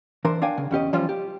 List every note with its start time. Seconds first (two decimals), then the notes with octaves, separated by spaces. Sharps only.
0.25 E3 D4 A#4 C5
0.42 D4 F5 G5 G#5
0.58 C#3
0.71 E2 C#4 G4 D#5
0.93 E3 F3 G3 C#4 F4 C5
1.09 G4